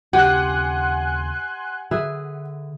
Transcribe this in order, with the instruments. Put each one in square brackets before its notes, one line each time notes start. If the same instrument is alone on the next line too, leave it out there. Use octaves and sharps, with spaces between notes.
[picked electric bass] D#2 C#3 C#4 [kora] G4 [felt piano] F#5 [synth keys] G#5 C6 F#6
[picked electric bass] D3 [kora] G#4 B4 E5